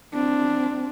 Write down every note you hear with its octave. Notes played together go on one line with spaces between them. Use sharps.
C4 D4